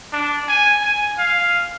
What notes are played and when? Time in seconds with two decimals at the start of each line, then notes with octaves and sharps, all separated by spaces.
0.13 D4
0.48 G#5
0.83 G#5
1.18 F5